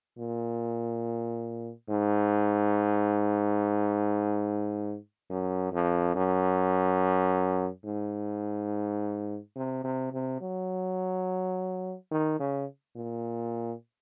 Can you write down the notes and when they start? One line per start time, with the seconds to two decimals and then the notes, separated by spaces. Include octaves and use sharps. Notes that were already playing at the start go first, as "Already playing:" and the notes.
0.18 A#2
1.89 G#2
5.30 F#2
5.72 F2
6.15 F#2
7.85 G#2
9.56 C3
9.84 C3
10.13 C3
10.41 F#3
12.11 D#3
12.40 C#3
12.96 A#2